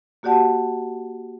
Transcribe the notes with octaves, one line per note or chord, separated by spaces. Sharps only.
A#3 F#4 G4 D5 F#5 A5